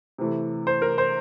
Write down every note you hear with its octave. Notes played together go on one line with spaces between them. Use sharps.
C3 E3 A3
C5
A#4
C5